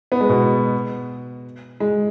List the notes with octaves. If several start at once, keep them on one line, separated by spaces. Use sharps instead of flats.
B3
G#3
B2
G#3